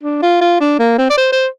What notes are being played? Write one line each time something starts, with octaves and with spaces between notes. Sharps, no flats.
D4
F4
F4
D4
A#3
C4
D5
C5
C5